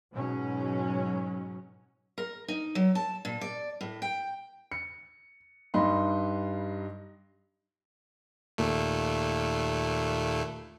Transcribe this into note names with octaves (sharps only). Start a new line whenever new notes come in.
G#2 B2 F#3 C#4
A#4
D#4
F#3
A5
A#2
D5
A2
G5
C#7
G2 G3 D#4 B5 C6
D#2 A#2 A3